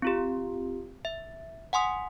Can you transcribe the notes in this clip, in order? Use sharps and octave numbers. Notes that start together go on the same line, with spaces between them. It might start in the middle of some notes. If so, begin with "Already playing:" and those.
C4 F4 G4
E5
F#5 G#5 C6 D#6